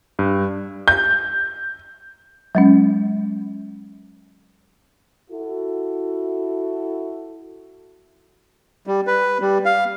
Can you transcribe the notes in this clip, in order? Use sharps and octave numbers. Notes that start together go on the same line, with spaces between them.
G2
G6
F#3 G#3 C#4
E4 F#4 A4
G3
B4
G3
F5